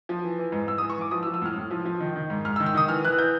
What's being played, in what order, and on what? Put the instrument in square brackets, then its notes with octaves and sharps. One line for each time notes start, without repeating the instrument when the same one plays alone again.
[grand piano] F3
E3
E3
G#2
G#2 E6
E3 D#6
C#6
E3 D6
F3 D#6
E6
F3
E6
A2 F6
A2
F3
F3
D#3
D#3
G#2
G#2 F6
E6
D#3
E6
D#3 D#6
E3 F6
E3 F#6
G6